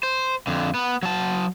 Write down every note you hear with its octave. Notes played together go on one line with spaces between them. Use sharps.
C5
F2 D3
B3
F#3 A5